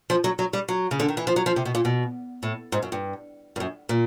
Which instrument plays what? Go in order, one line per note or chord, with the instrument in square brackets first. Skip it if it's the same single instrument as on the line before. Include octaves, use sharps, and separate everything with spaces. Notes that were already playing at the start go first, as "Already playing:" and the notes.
[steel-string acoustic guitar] F3
F#3
F#3
G3
F#3
C#3
D3
D#3
E3
F3
F#3
F3
C3
B2
A#2
B2
A2
G#2
F#2
G2
G2
F#2
A#2